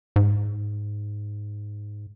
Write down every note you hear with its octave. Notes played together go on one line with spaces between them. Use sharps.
G#2